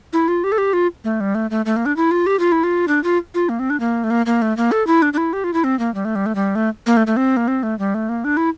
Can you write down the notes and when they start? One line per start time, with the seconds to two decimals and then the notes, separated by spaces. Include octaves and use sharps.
0.13 E4
0.28 F4
0.44 G4
0.52 A4
0.58 G4
0.73 F4
1.04 A3
1.20 G3
1.35 A3
1.51 A3
1.66 A3
1.76 A#3
1.86 D4
1.97 E4
2.11 F4
2.26 G4
2.39 F4
2.52 E4
2.64 F4
2.88 D4
3.04 F4
3.35 F4
3.49 A#3
3.59 C4
3.70 D4
3.80 A#3
4.04 A3
4.10 A#3
4.26 A#3
4.42 A3
4.57 A#3
4.72 A4
4.87 E4
5.02 D4
5.13 D4
5.18 E4
5.33 G4
5.44 F4
5.54 E4
5.64 C4
5.79 A#3
5.95 G3
6.05 A3
6.15 G3
6.26 A3
6.35 G3
6.55 A3
6.86 A#3
6.97 A3
7.07 A3
7.17 C4
7.37 A#3
7.48 C4
7.63 A3
7.79 G3
7.94 A3
8.09 A#3
8.24 D4
8.37 E4